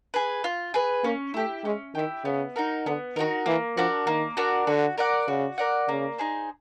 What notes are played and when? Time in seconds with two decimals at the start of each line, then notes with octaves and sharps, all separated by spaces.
0.14 G#4 B4
0.44 F4
0.74 G#4 B4
1.04 A#3 C#4
1.34 A3 E4 G4
1.65 G#3 C#4
1.95 D#3 E4 G4
2.25 C#3 B3
2.56 D#4 F#4 A#4
2.86 D3 B3
3.16 D#3 D#4 F#4 A#4
3.46 E3 A#3
3.77 F3 D4 F#4 A#4
4.07 D#3 A#3
4.37 D4 F#4 A#4
4.67 D3 F#4
4.98 A#4 D5 F#5
5.28 C#3 F#4
5.58 A#4 D5 F#5
5.89 C#3 A#3
6.18 D#4 G#4 C5